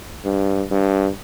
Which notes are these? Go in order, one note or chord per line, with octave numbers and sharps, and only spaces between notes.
G2
G2